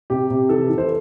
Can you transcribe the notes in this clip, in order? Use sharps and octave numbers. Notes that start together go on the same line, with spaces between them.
C3 G4
C3
E3 A4
E3
C5